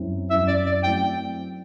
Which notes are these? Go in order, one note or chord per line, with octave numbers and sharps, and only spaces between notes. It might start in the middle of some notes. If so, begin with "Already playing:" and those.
Already playing: F#2 F#3 C4 E4
F#2 F#3 C4 E4 E5
D5
D5
F#3 A3 C4 E4 G5